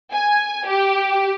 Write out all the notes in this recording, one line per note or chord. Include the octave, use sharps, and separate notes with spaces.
G#5
G4